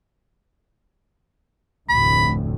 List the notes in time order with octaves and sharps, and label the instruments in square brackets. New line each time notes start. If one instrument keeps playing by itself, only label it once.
[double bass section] F1 D2 A2 [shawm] B5